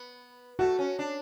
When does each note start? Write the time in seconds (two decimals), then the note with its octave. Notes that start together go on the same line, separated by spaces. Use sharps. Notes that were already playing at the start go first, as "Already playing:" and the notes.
Already playing: B3
0.59 A3 F#4
0.79 C#4
0.99 D4